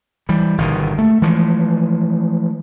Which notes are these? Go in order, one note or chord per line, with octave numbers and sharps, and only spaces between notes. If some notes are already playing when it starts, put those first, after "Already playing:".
E3 G3
G1 B2 D#3
A3
E3 F3 G#3 A3